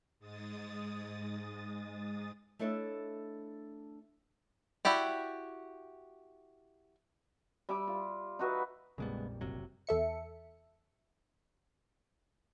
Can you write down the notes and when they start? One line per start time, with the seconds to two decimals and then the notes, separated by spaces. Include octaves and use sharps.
0.19 G#2 G#3 D#6 A6
2.59 A3 D4 E4 A4 C#5 D#5
4.85 E4 F#4 G4 D5
7.69 G3 E5 D6
7.88 F4
8.39 D#4 F#4 B4 E5
8.98 A#1 F2 C#3 G3 G#3 B3
9.41 F#1 C3 F#3
9.87 E2 A4 E5 C#7